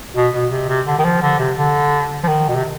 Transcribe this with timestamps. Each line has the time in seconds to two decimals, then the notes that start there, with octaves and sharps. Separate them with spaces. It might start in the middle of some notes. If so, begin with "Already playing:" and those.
0.16 B2
0.34 B2
0.51 C3
0.69 C3
0.87 D3
0.99 D#3
1.04 F3
1.22 D3
1.39 C3
1.57 D3
2.23 F3
2.28 D#3
2.49 B2
2.56 C3